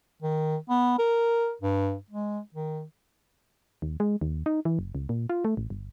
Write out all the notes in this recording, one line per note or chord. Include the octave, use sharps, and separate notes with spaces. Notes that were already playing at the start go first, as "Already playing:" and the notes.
D#3
B3
A#4
G2
G#3
D#3
D#2
G#3
D#2
D#4
E3
F#1
C#2
A#2
F4
A3
A1
G1